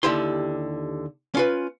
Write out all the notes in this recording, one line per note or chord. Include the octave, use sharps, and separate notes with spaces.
D#2 D3 E4 G4 C6
C#4 F4 B4